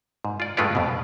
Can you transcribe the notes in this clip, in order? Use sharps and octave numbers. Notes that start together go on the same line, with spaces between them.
G#2
F4 D5
G2 G#3 A3 F4 B4 D5
F2 B2